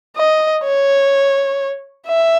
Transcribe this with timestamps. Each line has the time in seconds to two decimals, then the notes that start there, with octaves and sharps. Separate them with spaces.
0.17 D#5
0.64 C#5
2.07 E5